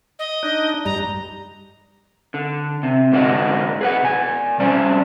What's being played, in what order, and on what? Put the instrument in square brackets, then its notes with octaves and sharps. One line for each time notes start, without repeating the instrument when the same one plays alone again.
[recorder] D#5
[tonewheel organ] D4 D#4
[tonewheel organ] G2 G3 [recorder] A#5
[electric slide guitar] D3
C3
G#2 D3 A#3 D4 F#4 D#5
G#4 B4 F#5
B2 G#5
G3 C#4 D4 C5 D5